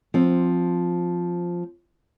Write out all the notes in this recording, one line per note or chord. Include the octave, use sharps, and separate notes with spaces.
F3 C4